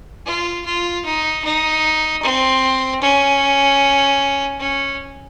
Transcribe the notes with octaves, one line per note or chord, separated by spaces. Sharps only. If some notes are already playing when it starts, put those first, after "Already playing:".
F4
F4
D#4
D#4
C4
C#4
C#4